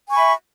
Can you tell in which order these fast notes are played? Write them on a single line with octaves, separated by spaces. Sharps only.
G#5 C#6 B5 E5